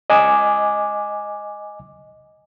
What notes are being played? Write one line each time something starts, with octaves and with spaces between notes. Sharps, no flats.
D#5 G#5 D6